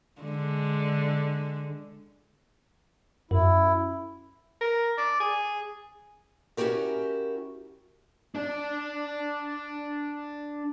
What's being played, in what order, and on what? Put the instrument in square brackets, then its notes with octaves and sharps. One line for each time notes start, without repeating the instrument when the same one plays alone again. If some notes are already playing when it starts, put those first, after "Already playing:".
[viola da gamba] D3 G#3
[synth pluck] F#2 [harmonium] E4
[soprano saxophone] A#4
D5
G#4
[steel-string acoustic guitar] C#4 E4 F#4 G4 A#4
[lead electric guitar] D4 D5